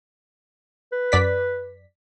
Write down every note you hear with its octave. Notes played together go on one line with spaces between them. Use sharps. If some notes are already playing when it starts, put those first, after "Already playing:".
B4
F#2 D5 B6